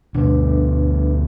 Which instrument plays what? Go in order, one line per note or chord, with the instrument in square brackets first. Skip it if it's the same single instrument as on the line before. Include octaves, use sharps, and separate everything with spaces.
[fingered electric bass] D2 B2 [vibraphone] D4 B4